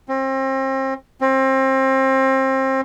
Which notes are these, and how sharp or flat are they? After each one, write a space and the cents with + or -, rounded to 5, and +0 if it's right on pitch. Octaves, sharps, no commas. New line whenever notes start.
C4 +35
C4 +30